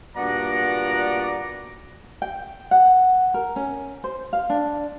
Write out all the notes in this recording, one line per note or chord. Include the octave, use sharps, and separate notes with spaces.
G2 A#2 B3 F#4 D5 A#5
G5
F#5
A#4
C#4
C5
F5
D4